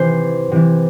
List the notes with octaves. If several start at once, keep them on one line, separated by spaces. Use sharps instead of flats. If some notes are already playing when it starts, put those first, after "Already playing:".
Already playing: C3 E3 C5
C3 E3